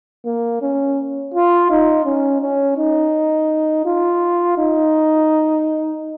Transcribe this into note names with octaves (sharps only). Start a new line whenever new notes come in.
A#3
C#4
F4
D#4
C#4
C#4
D#4
F4
D#4